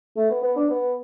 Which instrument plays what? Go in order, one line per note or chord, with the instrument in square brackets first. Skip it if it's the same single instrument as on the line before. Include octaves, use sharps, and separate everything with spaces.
[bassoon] A3
B3
B3
D4
B3